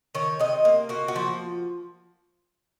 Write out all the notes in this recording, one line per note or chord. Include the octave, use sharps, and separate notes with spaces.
D#3 C#5
C3 D#5
A#3
A#3 F#4
F#4
F3